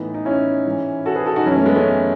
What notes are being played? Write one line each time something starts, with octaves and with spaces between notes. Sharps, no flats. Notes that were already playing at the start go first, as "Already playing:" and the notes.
Already playing: A2 E3 B3 D#4
D#4
C#4 E4
G#2 E3
F#4 A4
G#4 B4
F#4 A4
D#4 F#4
F#2 E3 C#4 E4
A3 C#4
G#3 B3
A3 C#4